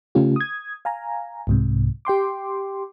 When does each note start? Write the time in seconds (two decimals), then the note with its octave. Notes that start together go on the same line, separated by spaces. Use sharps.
0.15 C#3 A3 C#4 F4 G4
0.36 D#6 G#6
0.85 F5 G#5 A#5
1.47 C2 G#2 C3
2.05 G4 G5 C6 D6